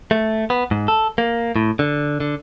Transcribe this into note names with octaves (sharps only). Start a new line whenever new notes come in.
A3
B3
G#2
A4
A#3
A2
D3
D3